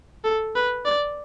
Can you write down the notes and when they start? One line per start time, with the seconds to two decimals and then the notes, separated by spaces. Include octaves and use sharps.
0.24 A4
0.56 B4
0.85 D5